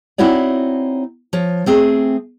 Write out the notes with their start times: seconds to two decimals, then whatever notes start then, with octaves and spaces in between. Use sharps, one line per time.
0.18 C4 D#4 E4 F#4 C#5 D5
1.33 F3 C#5
1.66 A3 C4 G#4